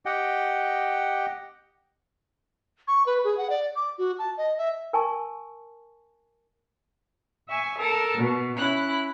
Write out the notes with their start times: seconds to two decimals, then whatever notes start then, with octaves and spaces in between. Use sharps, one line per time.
0.06 G4 D#5 F#5 G5
2.88 C#6
3.06 B4
3.24 G#4
3.37 F#5
3.50 D5
3.76 D6
3.98 F#4
4.19 A5
4.38 D#5
4.58 E5
4.93 A#4 G#5 A5 C#6
7.48 E5 G#5 C#6
7.78 A4 A#4 A5
8.18 B2
8.58 C#4 E4 F#6